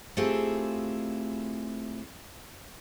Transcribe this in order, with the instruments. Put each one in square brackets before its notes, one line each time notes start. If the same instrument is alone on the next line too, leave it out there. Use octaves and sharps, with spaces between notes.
[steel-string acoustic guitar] A3 C4 E4 F4 G4 G#4